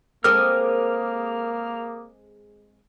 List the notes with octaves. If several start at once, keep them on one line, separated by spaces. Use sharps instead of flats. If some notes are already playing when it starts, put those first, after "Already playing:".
G#3 A#3 C4 A4 A#4 D6 D#6 F6